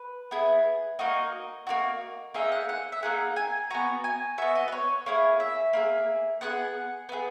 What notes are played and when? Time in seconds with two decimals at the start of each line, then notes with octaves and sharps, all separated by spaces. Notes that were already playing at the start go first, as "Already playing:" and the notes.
Already playing: B4
0.31 B3 E4 G#4
0.99 A#3 D#4 F#4 D#5
1.67 A#3 D#4 F#4
2.34 A#3 D#4 G#4 E5
2.52 F#5
2.69 F#5
2.92 E5
3.03 A#3 D#4 G#4 F#5
3.36 G#5
3.70 B3 F#4 A#5
4.04 G#5
4.38 B3 F#4 E5
4.55 D#5
4.68 B4
4.72 C#5
5.06 A#3 E4 G#4 C#5
5.40 E5
5.73 A#3 E4 G#4
6.41 B3 E4 G#4 F#5
7.09 B3 E4 G#4